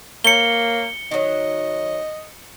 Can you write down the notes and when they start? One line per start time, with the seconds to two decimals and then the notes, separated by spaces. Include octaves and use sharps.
0.24 A#3 C#5 C#7 G7
1.11 D#3 F#3 D#5